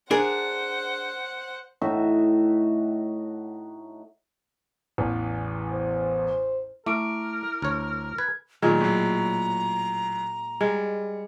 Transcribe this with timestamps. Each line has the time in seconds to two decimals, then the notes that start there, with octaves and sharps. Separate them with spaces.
0.11 D4 G#4 A#4 C5 F#5
1.81 A2 D#4 F#4 E5
4.98 A1 E2
5.72 C5
6.86 A3 E4 A#4 D6 D7
7.62 D2 C#5
8.18 B4 G#6
8.62 A#2 D#3 F#3 G#3 A3 A#5
8.81 A2 F#3
10.61 G3 G#3